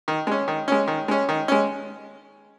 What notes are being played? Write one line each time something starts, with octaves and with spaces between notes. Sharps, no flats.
D#3
G#3 C#4
D#3
G#3 C#4
D#3
G#3 C#4
D#3
G#3 C#4